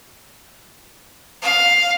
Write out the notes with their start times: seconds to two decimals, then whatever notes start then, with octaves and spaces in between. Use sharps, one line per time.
1.43 F5